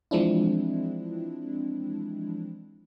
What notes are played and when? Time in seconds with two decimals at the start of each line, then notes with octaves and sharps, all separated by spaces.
0.11 E3 F3 G#3 C4 D4 E4